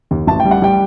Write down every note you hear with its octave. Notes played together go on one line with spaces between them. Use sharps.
D#2
A1 A5
G5
G3
F#5
G3 G5